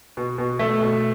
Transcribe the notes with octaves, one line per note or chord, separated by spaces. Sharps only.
B2
B2
A3
B2